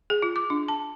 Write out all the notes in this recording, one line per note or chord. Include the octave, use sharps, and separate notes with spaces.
G#4
F4
D6
D4
A5